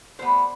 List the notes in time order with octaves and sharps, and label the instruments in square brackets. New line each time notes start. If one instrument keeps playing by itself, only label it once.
[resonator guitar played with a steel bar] A2 G3 B3 C5